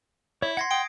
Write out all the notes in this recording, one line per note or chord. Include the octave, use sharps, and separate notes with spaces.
E4 C#5
F#5 C6 G#6 A#6 C7
G5 D#6 D7